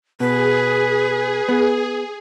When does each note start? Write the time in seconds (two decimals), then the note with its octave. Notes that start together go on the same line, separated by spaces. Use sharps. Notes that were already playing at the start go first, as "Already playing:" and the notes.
0.20 B2 G#4 B4
1.49 B3